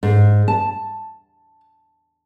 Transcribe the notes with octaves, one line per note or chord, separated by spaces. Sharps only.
G#2
A5